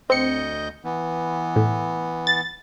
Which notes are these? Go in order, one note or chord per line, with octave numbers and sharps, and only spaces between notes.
D2 C4 D#5 G6 C#7
E3 B3
A2
A6